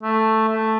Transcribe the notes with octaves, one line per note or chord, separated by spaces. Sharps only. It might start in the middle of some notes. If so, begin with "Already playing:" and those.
A3
A3